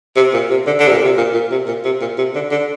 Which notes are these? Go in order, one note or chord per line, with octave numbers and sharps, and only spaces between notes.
C3
A#2
C3
D3
D3
C3
A#2
C3
A#2
A#2
C3
A#2
C3
A#2
C3
D3
D3